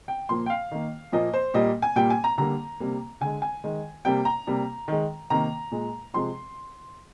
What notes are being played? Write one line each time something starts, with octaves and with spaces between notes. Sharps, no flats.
G5
A#2 F3 A#3 C6
G5
F5
D#3 A#3
A#2 F3 A#3 D#5
C5
A#2 G3 A#3 D#5
G#5
A#2 G3 A#3 G5
G#5
A#5
D3 G3 A#3 A#5
C3 G3 A#3
D3 G#3 G#5
G#5
D#3 G#3
C3 G3 A#3 G5
A#5
C3 G3 A#3
D#3 G#3
C3 D#3 A#3 A#5
A#2 G#3
C3 F3 G#3 C6